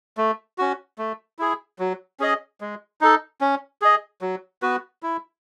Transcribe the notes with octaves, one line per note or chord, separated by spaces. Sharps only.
A3
C#4 F#4
A3
E4 G#4
F#3
C#4 G#4 D#5
G#3
D#4 A4
C#4
G#4 D#5
F#3
B3 F#4 B4
E4